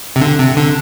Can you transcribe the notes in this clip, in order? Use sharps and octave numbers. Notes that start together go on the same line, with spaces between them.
C3
D3
C3
D3